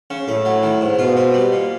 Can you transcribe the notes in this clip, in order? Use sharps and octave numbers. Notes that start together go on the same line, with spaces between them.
C#3
A2 A3
F#3
D#3
G#2
B2 F4
C4
G3
A#2